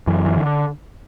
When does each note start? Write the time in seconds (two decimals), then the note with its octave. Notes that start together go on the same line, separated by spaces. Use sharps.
0.07 F#2 E3
0.26 E3
0.36 D3